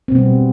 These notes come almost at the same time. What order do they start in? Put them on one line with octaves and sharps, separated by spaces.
C4 B2 B3 G3